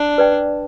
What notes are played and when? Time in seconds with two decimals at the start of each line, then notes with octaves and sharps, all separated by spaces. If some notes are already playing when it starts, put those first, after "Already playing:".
Already playing: D4
0.18 B4 D5 G5